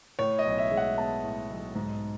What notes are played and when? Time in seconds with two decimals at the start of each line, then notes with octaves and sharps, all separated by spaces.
0.19 A2 C#5
0.39 D#5
0.45 B1
0.58 E5
0.71 G#3
0.77 F#5
0.98 B3 A5
1.24 A2
1.50 B1
1.75 G#2